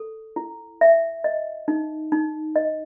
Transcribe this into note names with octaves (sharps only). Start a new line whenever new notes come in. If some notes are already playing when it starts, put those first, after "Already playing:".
Already playing: A4
E4
E5
D#5
D#4
D#4
D#5